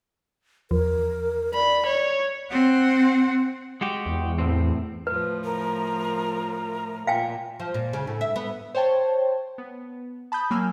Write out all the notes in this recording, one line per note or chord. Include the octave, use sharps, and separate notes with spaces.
E2 F3 A#4
D5 B5
C#5
C4 F#5
G#3 F#4 G4
E2
A2 C4
A2 F3 B4
A#4
A#2 F5 G5 G#5
F3
A#2
C#3
A2
E5
B3
C5 C#5 G5 A5
B3
A5 B5 D#6 G6
F#3 A#3 G#5 E6 F6 G6